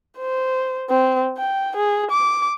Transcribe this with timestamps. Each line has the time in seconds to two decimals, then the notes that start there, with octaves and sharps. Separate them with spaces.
0.18 C5
0.90 C4
1.38 G5
1.76 G#4
2.11 D6